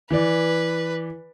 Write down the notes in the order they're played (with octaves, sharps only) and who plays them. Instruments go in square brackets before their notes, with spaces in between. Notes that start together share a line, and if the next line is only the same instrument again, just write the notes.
[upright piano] E3 D5 [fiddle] B4